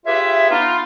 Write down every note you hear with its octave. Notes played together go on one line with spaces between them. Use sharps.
F4 G4 G#4 B4 C#5 E5
B3 D#4 F4